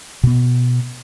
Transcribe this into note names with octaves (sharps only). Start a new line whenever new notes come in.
B2 B3